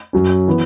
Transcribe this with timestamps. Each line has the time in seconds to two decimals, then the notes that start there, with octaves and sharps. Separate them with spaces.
0.13 F#2 F#3 C#4
0.48 E3 B3